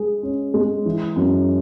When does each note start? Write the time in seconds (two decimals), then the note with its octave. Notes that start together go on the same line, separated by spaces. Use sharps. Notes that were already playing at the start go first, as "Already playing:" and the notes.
Already playing: G#3 G#4
0.23 C#4
0.54 G#3
0.85 E3
1.16 F#2